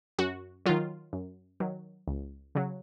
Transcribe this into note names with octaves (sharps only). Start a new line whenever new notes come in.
F#2 F#4
D#3 F#3 F4
F#2
D#3 F#3
C#2
C#3 F#3